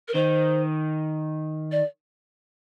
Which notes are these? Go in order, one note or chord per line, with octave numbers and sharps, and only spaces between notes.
A#4
D#3 C5
D5